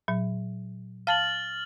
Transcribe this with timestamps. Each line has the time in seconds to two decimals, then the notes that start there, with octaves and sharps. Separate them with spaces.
0.08 A#2 F#3
1.07 F5 A5 F6 A6 F#7